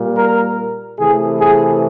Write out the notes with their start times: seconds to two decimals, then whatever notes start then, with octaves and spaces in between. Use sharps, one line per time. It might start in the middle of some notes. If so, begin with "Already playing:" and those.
Already playing: A#2 G3
0.17 A#4
0.98 C3 E3 A3 G#4
1.40 G#4